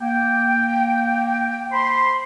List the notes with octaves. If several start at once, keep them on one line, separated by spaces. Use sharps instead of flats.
A#3 G5
C5 B5 C6